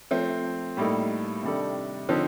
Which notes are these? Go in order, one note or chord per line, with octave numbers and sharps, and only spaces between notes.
F3 A3 C4
A2 G3 A#3 D#4 A4
C3 D#3 G3 D4 A4
D3 F3 C4 D#4 A4